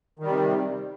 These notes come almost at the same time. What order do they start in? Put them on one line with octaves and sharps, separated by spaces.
D#3 G3 C3